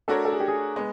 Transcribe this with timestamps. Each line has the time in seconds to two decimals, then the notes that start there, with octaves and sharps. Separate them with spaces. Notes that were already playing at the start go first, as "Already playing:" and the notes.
0.08 A3 D4 F#4 A4 A#4 C#5
0.25 A4
0.32 G#4
0.40 G4
0.48 G#4
0.76 G#3 B3